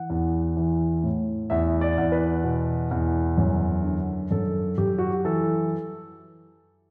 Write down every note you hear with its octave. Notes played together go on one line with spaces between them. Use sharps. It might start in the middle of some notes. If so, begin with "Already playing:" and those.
Already playing: E3 F#5
E2
E3
A2
E2 E5
D5
E2
B4
B2
E2
F#2
D3
F#2 A4
F#2 G4
F#4
G4
E3 A4